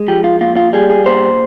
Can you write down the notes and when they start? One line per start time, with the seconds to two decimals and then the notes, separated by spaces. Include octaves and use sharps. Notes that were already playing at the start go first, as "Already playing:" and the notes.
Already playing: G#3
0.08 F3 G4
0.24 F4
0.41 A#2 F4
0.56 F4
0.73 G3 G#4
0.90 G#4
1.06 A#2 C5